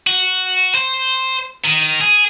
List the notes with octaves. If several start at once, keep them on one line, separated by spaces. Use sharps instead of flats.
F#4
C5
D#3
G#4